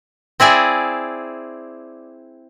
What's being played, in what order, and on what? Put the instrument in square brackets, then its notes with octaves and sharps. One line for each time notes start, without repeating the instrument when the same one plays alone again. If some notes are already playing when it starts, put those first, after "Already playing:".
[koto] C4 E4 G#4 D5